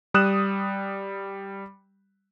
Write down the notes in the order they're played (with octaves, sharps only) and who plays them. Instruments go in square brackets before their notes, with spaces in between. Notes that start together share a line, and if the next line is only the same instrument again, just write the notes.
[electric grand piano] G3 D#6 F#6 E7